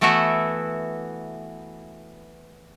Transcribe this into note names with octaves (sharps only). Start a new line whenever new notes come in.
E3 A3 B3 E4 F#4 E5